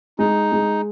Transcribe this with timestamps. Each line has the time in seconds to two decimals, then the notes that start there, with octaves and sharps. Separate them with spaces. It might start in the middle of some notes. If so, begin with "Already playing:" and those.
0.19 G#3 D#4
0.52 G#3